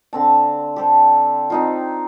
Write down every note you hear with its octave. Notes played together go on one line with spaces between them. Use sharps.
D3 C4 A5
G4 A4 C5
C4 D#4 F4